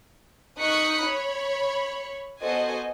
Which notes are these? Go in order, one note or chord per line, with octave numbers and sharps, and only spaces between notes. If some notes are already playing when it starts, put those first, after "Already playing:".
D#4 C#6 D#6 F#6 B6 C#7
C#5 B5
B3 F#4 A4 C5 D#5 G#5